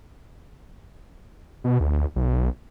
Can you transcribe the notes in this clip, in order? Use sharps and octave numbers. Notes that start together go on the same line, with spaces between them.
B2
D2
B1